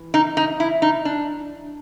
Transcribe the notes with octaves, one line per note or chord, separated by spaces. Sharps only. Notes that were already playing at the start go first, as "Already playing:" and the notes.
Already playing: E3
D#4
D#4
E4
D#4
D4